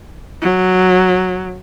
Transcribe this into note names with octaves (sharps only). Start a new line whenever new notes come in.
F#3